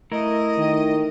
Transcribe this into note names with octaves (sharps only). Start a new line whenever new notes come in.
A3 E4 A#4 D#5
D#3